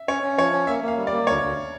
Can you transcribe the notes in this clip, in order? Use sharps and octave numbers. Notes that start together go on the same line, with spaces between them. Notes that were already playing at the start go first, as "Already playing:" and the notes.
Already playing: E5
C#4 C#5
C#4
F3 C#5
C#4
A#3 E5
A#3
F5
G3
D5
A#3
D2 C#5
D2